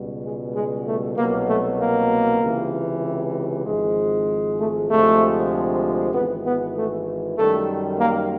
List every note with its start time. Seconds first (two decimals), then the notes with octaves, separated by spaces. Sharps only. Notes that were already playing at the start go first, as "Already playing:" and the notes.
Already playing: C#2 B2 G3
0.24 G#3
0.55 G#3
0.86 A3
1.17 C2 B2 F#3 A#3
1.48 A3
1.79 A#3
2.41 C#2 C3 E3
3.65 G#1 G#2 F3 G#3
4.58 A3
4.89 D2 C3 F3 G#3 A3
6.14 G#1 G#2 E3 B3
6.45 B3
6.75 A3
7.38 F#2 D#3 G3 A3
8.00 A#3